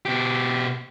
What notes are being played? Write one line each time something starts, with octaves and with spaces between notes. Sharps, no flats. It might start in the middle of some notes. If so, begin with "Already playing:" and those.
B2 G4